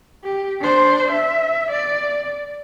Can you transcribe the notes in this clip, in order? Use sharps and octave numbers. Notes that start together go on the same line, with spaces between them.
G4
D4 C5
E5
D5